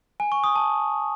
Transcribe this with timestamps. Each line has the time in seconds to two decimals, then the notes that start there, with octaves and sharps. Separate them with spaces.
0.20 G#5
0.32 C#6
0.44 D#6
0.56 A5